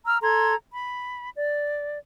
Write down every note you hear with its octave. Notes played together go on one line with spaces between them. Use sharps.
A#5 E6 F6
A4 A#5 C6 G#6
B5
D5